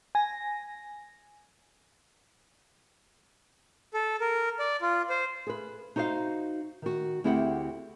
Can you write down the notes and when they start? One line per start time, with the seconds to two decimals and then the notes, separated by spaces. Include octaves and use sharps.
0.15 G#5 A#6
3.94 A4
4.21 A#4
4.59 D5
4.82 F4
5.10 C5
5.47 G#4 B4
5.96 D#4 F#4 C5 D#5 F5
6.82 D#3 F#4
7.24 D2 C4 E4 G4 G#4 F#5